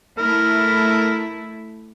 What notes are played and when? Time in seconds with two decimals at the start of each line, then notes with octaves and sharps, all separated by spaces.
0.19 A3 E4 A#4